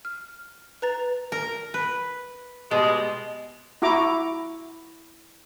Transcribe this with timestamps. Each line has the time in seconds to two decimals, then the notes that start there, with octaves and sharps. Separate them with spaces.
0.05 F6
0.82 B4 A#5 A6
1.32 A#4
1.74 B4
2.71 B2 G3 G#3
3.82 E4 F#4 A#5 D6